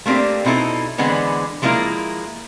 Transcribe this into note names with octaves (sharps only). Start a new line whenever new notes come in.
A3 A#3 C4 D4 G4
B2 C4 D#4 E4 A4
D3 E3 G#3 B3 C4
F3 G#3 A#3 C#4 E4 A#4